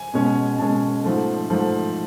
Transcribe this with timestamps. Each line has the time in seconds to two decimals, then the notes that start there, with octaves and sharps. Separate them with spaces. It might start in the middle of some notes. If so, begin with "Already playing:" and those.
Already playing: G#5
0.14 B2 G#3 C#4
0.58 B2 G#3 C#4 A5
1.04 G#2 F3 A3
1.50 G#2 F3 A3